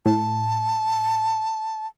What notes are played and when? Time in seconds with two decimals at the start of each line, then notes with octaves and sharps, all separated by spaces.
0.06 A2 A5